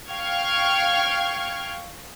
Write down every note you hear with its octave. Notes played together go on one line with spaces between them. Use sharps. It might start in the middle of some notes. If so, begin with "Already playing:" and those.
F5 G5 C#6 F6 G#6